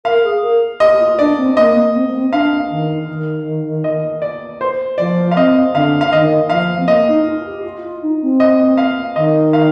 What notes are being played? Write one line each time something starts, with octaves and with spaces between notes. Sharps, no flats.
A#4 F5
G#4
A#4
G4 D#5
F4
D4 D5
C4
A#3 D#5
A#3
C4
A#3
C4
D4 F5
D#3
D#3
D#5
D5
C5
F3 D5
F5
C4 D#5
D3 F5
F5
D#3 D#5
F3 F5
C4
A#3 D#5
D#4
F4
G4
F4
F4
D#4
C4
D#5
F5
D#3 D#5
F5